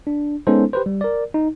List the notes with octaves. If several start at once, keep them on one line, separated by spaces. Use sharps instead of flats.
D4
G#3 B3 C#4 D#4 A4 C5
G4 B4 C5
G3
A#4 D5
D#4